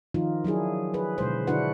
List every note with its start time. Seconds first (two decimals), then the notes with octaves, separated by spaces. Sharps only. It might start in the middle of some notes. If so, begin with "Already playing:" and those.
0.14 D#3 F3 D#4 F4
0.45 F#3 D4 E4 G#4
0.94 G#4 B4
1.18 B2 D3 G#3 C5
1.47 D3 D4 E4 F#4 B4 F#5